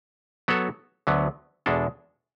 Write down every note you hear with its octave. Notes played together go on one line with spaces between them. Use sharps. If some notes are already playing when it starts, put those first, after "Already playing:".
F#3 B3 F#4 A4 C#5
D2 D3 F#3 B3
E2 B2 G#3 D4 A4